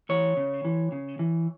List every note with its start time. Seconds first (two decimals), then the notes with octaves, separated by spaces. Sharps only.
0.09 E3 C#5
0.37 C#3
0.65 E3
0.92 C#3
1.19 E3